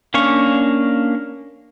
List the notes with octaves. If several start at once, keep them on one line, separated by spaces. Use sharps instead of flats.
A#3 C#4 D4 F5 C#6